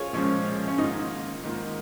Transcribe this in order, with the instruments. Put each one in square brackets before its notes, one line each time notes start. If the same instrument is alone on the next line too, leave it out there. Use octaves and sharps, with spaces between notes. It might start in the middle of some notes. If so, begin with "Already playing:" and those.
Already playing: [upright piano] F4 G#4 C#5
[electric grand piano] A#2 F3 G#3 [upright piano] C#4
[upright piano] C#4
[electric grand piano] G#2 D#3 A#3 F4 [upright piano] D#4
[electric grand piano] G#2 D#3 A#3 F4